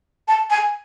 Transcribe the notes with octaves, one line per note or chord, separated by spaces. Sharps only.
A5
G#5